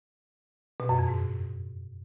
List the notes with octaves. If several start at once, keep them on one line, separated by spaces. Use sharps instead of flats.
B2
F#2
F2
G#2